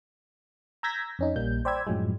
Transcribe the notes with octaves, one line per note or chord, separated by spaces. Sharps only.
A#5 E6 G6 G#6 A#6 B6
F2 C#4 D#4
A#1 G3 A#3 G6
C5 D5 G5 B5 E6 G#6
F#2 A2 F3 F#3 G#3